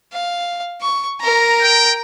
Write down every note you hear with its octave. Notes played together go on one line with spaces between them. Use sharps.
F5
C#6
A#4 A#5
G5